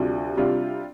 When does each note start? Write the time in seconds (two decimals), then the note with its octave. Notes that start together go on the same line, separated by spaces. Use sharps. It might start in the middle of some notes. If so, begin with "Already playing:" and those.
Already playing: D2 C3 G3 D4 F4
0.37 C3 G3 D4 F4